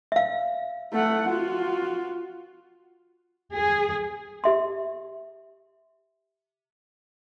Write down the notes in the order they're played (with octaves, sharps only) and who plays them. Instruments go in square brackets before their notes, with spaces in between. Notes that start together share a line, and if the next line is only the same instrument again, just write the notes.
[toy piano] E5 F5
[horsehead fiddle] A3 F#5
F4 F#4
[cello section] G#4
[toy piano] G4 E5 C6